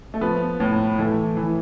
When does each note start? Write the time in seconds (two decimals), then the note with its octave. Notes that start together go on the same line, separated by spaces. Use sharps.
0.14 A3
0.21 F3 B3
0.60 A2
0.99 E3 A3
1.37 E3